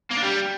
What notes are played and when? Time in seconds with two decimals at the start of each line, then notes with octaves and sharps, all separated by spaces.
0.11 A#3
0.17 D4
0.23 G3